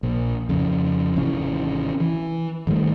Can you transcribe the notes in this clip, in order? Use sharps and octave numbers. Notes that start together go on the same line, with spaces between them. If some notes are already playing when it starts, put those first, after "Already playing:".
A#1
F2 C#3
G#1 C3 E3 C#4
E3
G#1 D#3 G3 A3